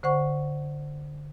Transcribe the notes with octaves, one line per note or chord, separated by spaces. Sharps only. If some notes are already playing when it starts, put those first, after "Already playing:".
D3 C5 F#5 C#6